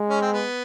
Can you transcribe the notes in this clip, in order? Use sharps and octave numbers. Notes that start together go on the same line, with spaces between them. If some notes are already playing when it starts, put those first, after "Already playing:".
Already playing: G#3
C#4
C4
B3